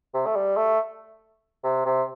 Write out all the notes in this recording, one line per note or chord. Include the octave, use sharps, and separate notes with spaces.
C3
A3
G3
A3
C3
C3